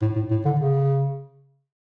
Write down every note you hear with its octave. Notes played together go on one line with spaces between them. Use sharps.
A2
A2
A2
D3
C#3